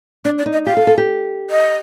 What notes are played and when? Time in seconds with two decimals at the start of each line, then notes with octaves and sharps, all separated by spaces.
0.25 D4 D5
0.39 D5
0.46 D#4
0.53 D#5
0.66 G4 F5
0.77 A4
0.87 A4
0.98 G4
1.50 D#5